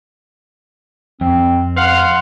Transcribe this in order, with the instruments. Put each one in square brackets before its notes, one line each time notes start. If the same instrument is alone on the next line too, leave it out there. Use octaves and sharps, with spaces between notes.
[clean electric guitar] F2 [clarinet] C4
[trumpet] F5 [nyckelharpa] F#5 [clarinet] C6